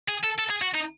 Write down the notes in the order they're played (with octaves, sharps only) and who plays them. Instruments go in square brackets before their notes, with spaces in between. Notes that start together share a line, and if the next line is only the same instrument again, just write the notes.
[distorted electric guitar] G#4
A4
A4
G#4
F#4
D#4